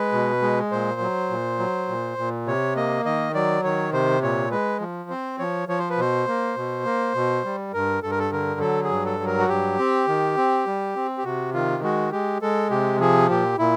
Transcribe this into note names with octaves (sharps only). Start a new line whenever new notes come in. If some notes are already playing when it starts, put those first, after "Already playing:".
Already playing: G#3 B4
B2
G#3
A#2 C5
F#3
A#2
F#3
A#2
A#2
C3 C#5
A#3 D#5
D#3 D#5
F#3 D5
D#3 C#5
C3 C5
A#2 C#5
G#3 B4
F3
C4 C5
F3 C#5
F3 C#5
C5
B4
B2 C5
A#3
B2
A#3
B2
G3
G2 A#4
G2 A4
A#4
A4
D3 A#4
F#3 A4
G#4
G2
A4
F#3
A#4
F#4
G2 G4
C4
D#3
C4
G3
C4
G4
C3 F#4
D#3 F4
G#3 F#4
G#3 G4
G#3 A4
C3 G4
F3 G#4
A#2 G4
A#2 E4